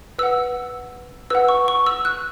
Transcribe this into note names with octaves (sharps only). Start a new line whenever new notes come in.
B4 F#5 E6
B4 F#5 E6
C#6
C#6
E6
F#6